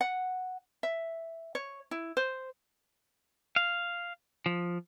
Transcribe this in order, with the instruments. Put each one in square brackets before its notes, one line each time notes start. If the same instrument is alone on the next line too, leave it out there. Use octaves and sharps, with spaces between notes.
[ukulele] F#5
E5
C#5
E4
C5
[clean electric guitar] F5
F3